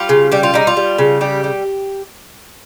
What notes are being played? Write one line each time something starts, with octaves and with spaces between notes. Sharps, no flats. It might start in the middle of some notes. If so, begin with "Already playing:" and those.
Already playing: G3 F4
C#3
G3 G4
F4
G3 D#4
F4
G3
C#3
G3 G4
G3